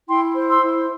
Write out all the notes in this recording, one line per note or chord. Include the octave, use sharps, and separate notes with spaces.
E4 G5 C6
C5
C6 E6
E4